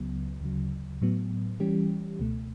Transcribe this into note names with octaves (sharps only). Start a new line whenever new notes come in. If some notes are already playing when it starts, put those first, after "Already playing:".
Already playing: C#2 C#3 F#3 B3
D2 C#3 F#3
A2 F#3 B3
E3 G3 C#4 G4
C#2 B2 A3